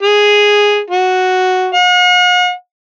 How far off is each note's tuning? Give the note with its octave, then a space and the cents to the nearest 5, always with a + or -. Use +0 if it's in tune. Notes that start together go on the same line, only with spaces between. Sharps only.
G#4 -5
F#4 +0
F#5 -45